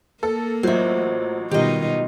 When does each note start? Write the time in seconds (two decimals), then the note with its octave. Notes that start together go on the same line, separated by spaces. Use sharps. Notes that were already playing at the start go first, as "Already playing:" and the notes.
0.23 A#3 A4
0.63 A1 F#3 F4 C5 E5
1.51 B2 D#3 G3 D#4 F4 G4 A#4 D#5